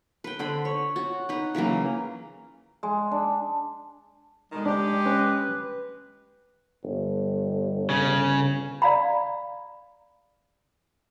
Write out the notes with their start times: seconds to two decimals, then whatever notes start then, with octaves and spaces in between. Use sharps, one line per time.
0.24 B4 G5
0.39 D3 C5 B5
0.65 C#5
0.96 F#4
1.29 D#4 B4
1.55 C#3 E3 F#3 A#3
2.83 G#3
3.11 D4
4.52 B2 D3 D#3 G#3
4.66 D4 G4
5.06 C#4 B4
6.84 G1
7.90 C#3
8.82 D5 F5 A#5 B5